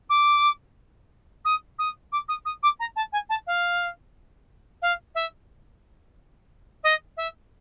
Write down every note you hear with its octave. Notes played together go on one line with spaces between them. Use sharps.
D6
D#6
D#6
D6
D#6
D#6
D6
A#5
A5
G#5
A5
F5
F5
E5
D#5
E5